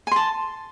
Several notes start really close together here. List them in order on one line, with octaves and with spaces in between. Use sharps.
G#5 C6 A5